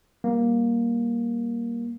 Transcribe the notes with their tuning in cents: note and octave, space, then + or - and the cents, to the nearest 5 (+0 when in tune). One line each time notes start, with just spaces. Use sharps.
G3 +0 A#3 +15